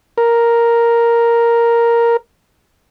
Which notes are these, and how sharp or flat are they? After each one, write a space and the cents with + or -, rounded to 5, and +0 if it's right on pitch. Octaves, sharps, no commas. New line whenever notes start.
A#4 +0